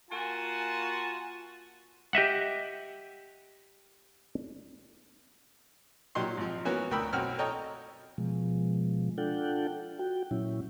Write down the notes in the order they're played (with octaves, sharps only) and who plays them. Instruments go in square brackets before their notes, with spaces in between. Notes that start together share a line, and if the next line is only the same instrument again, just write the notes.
[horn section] A#3 F4 F#4 G#5 A5
[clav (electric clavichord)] G4 D#5 E5 F#5
[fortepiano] A#2 F#3 D#4 G4 C6
G#1 F3
E3 A#3 B3 C#4 F#4 C#5
D2 A#4 G5 B5 D#6 E6
B1 F#2 C4 F#4 G5 F6
A4 C#5 D#5 G5 A#5
[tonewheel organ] B2 F3 G#3
D4 F4 A4 F#5 G5
F#4 G5
A#2 F#3 C#4 E4